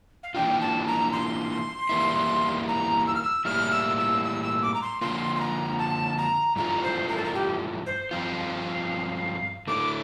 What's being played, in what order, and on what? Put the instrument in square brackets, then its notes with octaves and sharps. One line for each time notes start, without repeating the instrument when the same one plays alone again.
[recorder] F5
[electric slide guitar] E3 A#3 D4 F4 [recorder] G5
[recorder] A5
A#5
C6
[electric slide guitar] E2 E3 G3 A#3 E4
[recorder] A#5
E6
F6
E6
[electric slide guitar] A2 G3 A#3 E4 [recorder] F6
[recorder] E6
E6
E6
E6
D6
A#5
C6
[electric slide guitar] D3 F3 A#3 F4 [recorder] C6
[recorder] C6
A#5
A5
A#5
[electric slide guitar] G2 E3 A3 D4 F4 [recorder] A#5
[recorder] C5
A#4
A4
A#4
G4
C5
[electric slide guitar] G2 F3 C4 F4 [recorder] F5
[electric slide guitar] D3 A3 E4 [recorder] D6